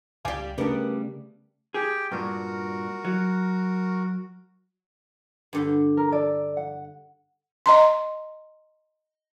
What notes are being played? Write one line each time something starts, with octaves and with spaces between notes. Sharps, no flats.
C#2 G3 G4 D5 F5 G#5
C#3 G3 A3 B3 D4 A#4
G4 G#4 G5
G2 A#2 F#4 A#4
F#3
G2 D3 G4
A#4
A4 D5
F#5
D#5 A#5 C6